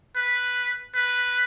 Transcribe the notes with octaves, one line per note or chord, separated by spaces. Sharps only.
B4
B4